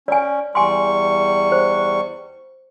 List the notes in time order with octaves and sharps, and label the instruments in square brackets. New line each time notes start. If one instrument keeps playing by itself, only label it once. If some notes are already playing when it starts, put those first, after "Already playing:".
[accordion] C#4 [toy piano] D5 G#5
[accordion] E2 G3 C#6 [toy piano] G#5 C6
[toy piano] C5